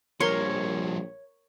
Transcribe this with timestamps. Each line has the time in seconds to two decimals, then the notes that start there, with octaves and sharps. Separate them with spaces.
0.20 A#1 F3 G3 A#4 C#5 C6